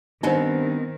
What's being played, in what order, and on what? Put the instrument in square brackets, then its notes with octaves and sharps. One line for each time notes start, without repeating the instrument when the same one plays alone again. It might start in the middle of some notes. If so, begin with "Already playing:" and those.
[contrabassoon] G2 [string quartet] D#3 [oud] B3 C4 D#5 [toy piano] D#4 C5